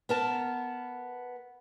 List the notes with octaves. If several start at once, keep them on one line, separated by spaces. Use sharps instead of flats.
B3 A#4 A5